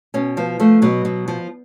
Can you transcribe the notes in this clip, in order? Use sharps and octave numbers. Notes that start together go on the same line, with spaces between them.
B2 C#4
F3 B3
F3 A3
B2 F#3
B2
F3